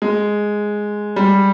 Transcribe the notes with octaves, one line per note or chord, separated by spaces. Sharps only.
G#3
G3